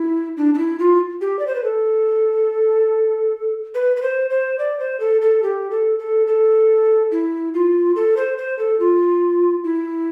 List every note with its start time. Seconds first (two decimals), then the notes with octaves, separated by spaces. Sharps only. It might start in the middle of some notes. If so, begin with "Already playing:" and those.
Already playing: E4
0.37 D4
0.54 D4
0.58 E4
0.79 F4
1.21 G4
1.39 D5
1.47 C5
1.55 B4
1.64 A4
3.74 B4
3.97 B4
4.02 C5
4.30 C5
4.59 D5
4.80 C5
5.00 A4
5.21 A4
5.43 G4
5.71 A4
5.99 A4
6.27 A4
7.11 E4
7.54 F4
7.96 A4
8.17 C5
8.38 C5
8.59 A4
8.80 F4
9.64 E4